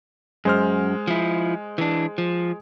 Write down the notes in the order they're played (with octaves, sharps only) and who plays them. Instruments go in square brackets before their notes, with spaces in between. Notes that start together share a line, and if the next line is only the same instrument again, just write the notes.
[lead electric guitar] F#2 [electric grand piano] G#3 C5 F6
[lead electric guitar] F3 E4
E3 D4
F3